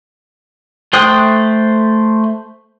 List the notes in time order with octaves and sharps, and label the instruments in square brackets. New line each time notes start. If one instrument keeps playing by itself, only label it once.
[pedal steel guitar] A3 C5 G5 D#6 F#6